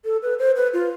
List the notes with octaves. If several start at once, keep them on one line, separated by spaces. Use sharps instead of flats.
A4
B4
C5
B4
F4